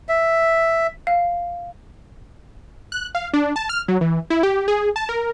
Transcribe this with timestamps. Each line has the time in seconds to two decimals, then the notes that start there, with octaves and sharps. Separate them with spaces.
0.09 E5
1.07 F5
2.92 F#6
3.15 F5
3.33 D4
3.56 A5
3.69 F6
3.88 F#3
4.01 E3
4.30 E4
4.43 G4
4.68 G#4
4.96 A5
5.09 A#4